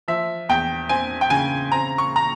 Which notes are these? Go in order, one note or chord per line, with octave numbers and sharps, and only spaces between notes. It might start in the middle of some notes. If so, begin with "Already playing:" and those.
F3 E5
E2 G5
C4 G#5
G5
C#3 G#5
C4 A#5
C#6
A#5